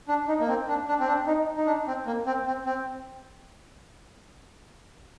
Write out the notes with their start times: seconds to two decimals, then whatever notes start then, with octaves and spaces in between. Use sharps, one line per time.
0.08 D4
0.28 D#4
0.40 A#3
0.48 C4
0.68 D4
0.88 D4
1.00 C4
1.07 D4
1.27 D#4
1.57 D#4
1.66 D4
1.87 C4
2.06 A#3
2.26 C4
2.46 C4
2.66 C4